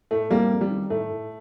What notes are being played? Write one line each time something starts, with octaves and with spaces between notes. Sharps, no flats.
A2 A3
F2 G3 A#3
F2
G3
D#3
A2 A3
A2